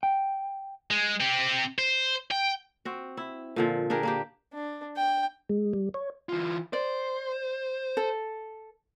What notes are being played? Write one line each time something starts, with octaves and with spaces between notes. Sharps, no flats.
G5
G#3
C4 G4
C5
G5
C4 F#4
E4
A#2 D3 F3
D4 G4 G#4 A#4
A#3 D4 G4
D4
G5
G#3
G3
C#5
E3 F4
C5 D5
A4